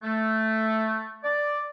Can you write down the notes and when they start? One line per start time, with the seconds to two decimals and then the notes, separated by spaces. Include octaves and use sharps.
0.03 A3
1.24 D5